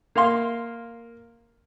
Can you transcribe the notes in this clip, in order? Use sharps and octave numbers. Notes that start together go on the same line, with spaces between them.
A#3 F5 C6